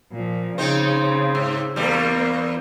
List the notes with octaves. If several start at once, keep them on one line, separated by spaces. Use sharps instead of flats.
A#2 F3
C#3 C4 D#4
G#2
E2 G3 A#3